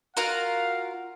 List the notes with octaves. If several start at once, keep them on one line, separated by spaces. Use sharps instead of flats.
F4 F#4 A#4 F5